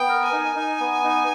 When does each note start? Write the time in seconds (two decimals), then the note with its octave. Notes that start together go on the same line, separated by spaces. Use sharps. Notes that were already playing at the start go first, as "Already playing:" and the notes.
Already playing: B3 G5
0.09 A#4
0.25 G#5
0.33 D#4
0.56 D#4
0.80 B3
1.04 D#4